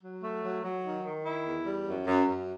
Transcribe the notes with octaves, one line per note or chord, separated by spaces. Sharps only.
F#3
A3
F#3
F#3
D#3
D#3
E4
E2
G3
F#2
F#2
F#2